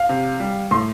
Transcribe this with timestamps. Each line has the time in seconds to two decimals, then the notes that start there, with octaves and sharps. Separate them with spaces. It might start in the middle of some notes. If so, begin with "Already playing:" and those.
Already playing: F5
0.09 C3
0.40 G3
0.71 A2 C6